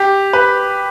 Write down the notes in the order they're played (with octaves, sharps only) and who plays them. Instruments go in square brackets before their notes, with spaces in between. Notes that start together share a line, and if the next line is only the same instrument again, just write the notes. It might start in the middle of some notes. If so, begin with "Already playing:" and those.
Already playing: [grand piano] G4
B4